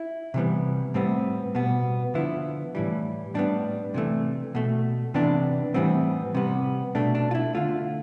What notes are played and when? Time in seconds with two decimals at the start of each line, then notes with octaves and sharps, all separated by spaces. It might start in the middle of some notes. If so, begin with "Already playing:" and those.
Already playing: E4
0.34 C3 E3 G3 B3
0.94 A2 G3 B3 C4
1.55 B2 G3 B3
2.14 D3 F3 B3 E4
2.75 A2 E3 G3
3.34 A2 G3 B3 D4
3.94 C3 E3 A3
4.55 B2 A3
5.14 C3 E3 B3 D4
5.74 A2 E3 G3 B3 C4
6.35 C3 G3 B3
6.95 B2 A3 D4
7.15 D4
7.31 F4
7.35 E4
7.54 D3 A3 F4